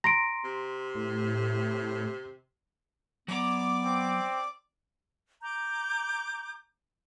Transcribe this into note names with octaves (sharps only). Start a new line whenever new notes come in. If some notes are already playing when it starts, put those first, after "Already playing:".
A#5 C6 A#6 D7
C3
A2
F#3 B3 D5 A#5 D6
C4
A#5 D6 G6